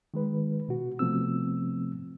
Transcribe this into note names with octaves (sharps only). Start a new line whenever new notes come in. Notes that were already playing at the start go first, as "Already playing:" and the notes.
D#3 G#3 B4
B2 F#4
C3 F3 A3 B3 C4 E6